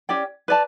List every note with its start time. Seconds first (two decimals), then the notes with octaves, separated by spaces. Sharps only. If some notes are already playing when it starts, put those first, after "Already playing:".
0.09 C#4 G4 D5 G5
0.48 B4 D5 A5